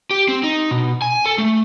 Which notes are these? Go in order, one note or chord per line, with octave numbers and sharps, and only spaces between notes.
G4
C4
D#4
B2
G#5
A4
A3